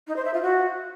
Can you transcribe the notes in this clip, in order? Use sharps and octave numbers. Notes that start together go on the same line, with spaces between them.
D#4
C5
E5
F4
F#4